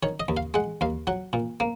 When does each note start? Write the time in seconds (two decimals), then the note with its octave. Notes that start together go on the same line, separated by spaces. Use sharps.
0.03 D#3 C#5
0.20 D#5
0.28 D#2
0.37 F5
0.54 G#3 F#5
0.81 D#2 F5
1.07 F#3 F#5
1.33 A#2
1.60 A#3